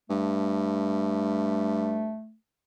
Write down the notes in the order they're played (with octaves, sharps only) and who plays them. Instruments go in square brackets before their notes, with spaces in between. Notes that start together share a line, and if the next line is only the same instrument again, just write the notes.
[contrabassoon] G2 [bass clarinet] A3